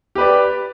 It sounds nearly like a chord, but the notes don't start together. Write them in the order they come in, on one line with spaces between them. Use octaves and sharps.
G4 B4 D5